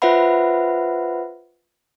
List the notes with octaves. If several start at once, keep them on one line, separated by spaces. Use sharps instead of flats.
F4 B4 C5 E5 F#5 B5